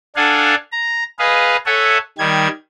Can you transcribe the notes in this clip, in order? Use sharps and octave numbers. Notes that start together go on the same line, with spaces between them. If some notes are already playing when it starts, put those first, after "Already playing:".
D4 A4 F5 F#5 G#5
A#5
G#4 B4 D#5 F5
A4 C#5 E5 F#5 G#5
D#3 G3 G#6